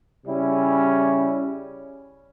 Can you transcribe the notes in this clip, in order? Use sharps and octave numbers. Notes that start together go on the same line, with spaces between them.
C#3 G3 C#4 E4